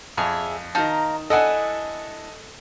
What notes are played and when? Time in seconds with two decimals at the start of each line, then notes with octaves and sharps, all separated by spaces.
0.17 F2 G#4 C#5 E5
0.75 D#3 D#4 F5 A5 A#5
1.30 D4 E4 A4 D#5 F#5 G#5 D#6